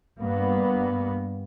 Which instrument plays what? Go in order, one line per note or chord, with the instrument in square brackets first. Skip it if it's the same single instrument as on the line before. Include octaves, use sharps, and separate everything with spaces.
[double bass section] G2 A#3 B3